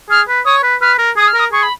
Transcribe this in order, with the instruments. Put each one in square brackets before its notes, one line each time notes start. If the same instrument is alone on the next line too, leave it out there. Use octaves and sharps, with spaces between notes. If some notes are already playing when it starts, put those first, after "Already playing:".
[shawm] G#4 [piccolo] F6
[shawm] B4
[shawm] C#5 [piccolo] D#6
[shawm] B4
[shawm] B4 [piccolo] F6
[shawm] A#4
[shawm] G#4 [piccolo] D#6
[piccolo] F6
[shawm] A#4
[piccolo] D#6
[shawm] G#4 [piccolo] C#6
[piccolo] B5